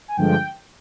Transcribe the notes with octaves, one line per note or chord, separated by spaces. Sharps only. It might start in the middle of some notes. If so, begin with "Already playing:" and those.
G#5
G2 D3 F3 G#3 G5